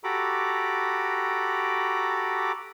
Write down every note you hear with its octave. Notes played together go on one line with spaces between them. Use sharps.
F#4 G4 A4 A#5 B5 D6